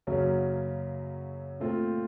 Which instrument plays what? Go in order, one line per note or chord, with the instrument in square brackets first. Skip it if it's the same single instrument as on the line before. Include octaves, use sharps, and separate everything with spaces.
[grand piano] F#2 C#3 F#3 A#3 C#4
A#2 A3 C4 F4